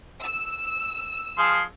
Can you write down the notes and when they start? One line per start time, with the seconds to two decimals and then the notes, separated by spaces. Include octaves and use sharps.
0.24 E6
1.38 F3 G#4 C6